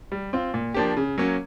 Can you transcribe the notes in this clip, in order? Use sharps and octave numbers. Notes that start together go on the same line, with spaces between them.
G3
C4 F4
A#2
F3 A#3 D4 G4
C#3
F#3 A#3 C#4